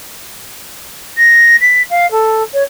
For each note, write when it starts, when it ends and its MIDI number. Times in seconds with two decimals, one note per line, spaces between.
1.18 1.56 94
1.61 1.82 95
1.90 2.09 77
2.11 2.43 69
2.53 2.62 73